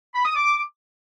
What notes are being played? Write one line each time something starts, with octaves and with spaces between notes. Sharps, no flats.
B5
D#6
D6